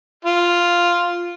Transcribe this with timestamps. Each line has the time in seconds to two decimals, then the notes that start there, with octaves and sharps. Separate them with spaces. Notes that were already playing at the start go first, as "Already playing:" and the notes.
0.25 F4